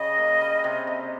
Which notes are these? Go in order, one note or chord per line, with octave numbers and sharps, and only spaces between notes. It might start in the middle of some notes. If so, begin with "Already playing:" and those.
Already playing: C#3 G3 D#5
A#3
G3
C3
C3